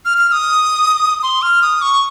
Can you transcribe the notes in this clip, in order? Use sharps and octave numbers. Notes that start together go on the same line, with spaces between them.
F6
F6
D#6
C6
F6
D#6
C#6